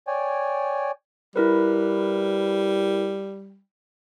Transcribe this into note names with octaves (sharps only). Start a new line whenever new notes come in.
C#5 D5 G5 G#5
G3 E4 A#4 B4